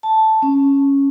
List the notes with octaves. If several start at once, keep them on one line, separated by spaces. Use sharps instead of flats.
A5
C#4